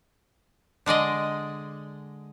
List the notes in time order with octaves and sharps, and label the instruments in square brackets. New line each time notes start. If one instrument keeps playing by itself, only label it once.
[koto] D3 G#3 D5 D#5